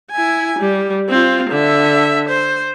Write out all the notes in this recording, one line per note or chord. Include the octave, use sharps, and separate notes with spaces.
E4 G#5
G3
C4 F4
D3 E5
C5